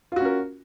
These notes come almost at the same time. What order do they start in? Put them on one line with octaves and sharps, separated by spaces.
F4 F#4 C#4 A#4